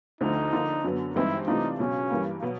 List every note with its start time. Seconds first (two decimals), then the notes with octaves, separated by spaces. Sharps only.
0.21 D2 D3 F3 A3 D#4
0.53 D3 F3 A#3 D4
0.84 F#2 D3 F#3 B3
1.16 G2 E3 G#3 C4 D#4 E4
1.47 C3 E3 A3 D4 D#4 F4
1.79 C#2 B2 F#3 C#4
2.11 G2 E3 G3 A#3
2.42 B2 F#3 B3